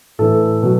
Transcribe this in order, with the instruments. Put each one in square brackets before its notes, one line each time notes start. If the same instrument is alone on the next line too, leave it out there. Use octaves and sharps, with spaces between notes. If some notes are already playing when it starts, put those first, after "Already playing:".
[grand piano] A2 E3 A4
B2 F#3